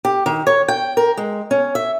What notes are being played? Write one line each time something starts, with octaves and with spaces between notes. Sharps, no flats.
G4
D#3
C#5
G5
A#4
G#3
C#4
E5